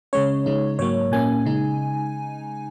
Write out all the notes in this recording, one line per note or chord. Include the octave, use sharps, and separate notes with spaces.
C#3 G#3 C#4 C#5
C#3 G#3 D#4
G#2 F#3 A#3 C#5
A#2 A#3 C#4 G#5
C#3 G#3 D#4